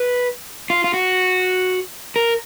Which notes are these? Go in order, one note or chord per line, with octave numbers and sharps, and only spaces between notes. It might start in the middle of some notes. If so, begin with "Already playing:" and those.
Already playing: B4
F4
F4
F#4
A#4